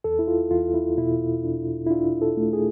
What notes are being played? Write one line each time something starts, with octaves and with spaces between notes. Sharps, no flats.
E2 A4
E4
F4
E2 F4
E4
B2 E4
D4
E4
D4 F4
A4
A3
G#4